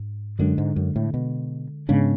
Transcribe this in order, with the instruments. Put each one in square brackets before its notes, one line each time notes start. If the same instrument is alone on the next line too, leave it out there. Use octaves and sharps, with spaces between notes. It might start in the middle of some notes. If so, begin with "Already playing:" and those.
Already playing: [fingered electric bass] G#2
[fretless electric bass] F#2 [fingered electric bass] D3 G#3 D4
[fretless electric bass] G#2
F#2
A2
B2
[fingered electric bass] G#2 G#3 B3 D4 [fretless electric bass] C#3